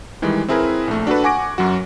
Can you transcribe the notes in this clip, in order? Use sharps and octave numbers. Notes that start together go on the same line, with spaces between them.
D#3 E3 G3 G#3
C4 E4 G#4 A#4 B4
A#1 A3
D4 F#4 A4 B4
F#5 G#5 C#6 D6 A#6 D7
F#2 F#3 F#4